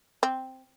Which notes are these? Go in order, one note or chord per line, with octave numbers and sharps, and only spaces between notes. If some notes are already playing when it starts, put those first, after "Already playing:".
C4